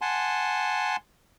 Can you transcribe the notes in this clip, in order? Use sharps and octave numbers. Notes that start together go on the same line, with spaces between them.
F#5 G#5 A5 C6